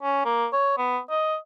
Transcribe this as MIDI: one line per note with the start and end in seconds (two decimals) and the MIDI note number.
0.03 0.23 61
0.25 0.46 58
0.53 0.74 73
0.78 0.99 59
1.10 1.36 75